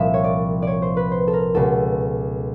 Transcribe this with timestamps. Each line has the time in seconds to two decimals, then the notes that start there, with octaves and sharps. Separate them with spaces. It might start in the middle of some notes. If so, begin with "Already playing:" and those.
Already playing: C2 A#2 F3 E5
0.14 C#5
0.24 D5
0.62 C#5 D5
0.82 C5
0.97 B4
1.11 C5
1.27 A4
1.33 A#4
1.55 C#2 B2 A4